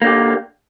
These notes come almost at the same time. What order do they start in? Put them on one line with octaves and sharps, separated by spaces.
A#3 D3 G4